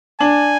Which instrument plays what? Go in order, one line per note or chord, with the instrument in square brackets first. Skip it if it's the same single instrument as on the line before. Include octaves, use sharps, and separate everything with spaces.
[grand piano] D4 [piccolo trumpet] G#5